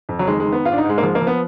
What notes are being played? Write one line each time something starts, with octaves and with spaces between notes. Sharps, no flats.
F2
F#3
D#3 G#3
G#3
D#3
B3
G#2 F4
D4
D#4
G#2
G#3
A#3
F3 G#3
A#3
F3
B3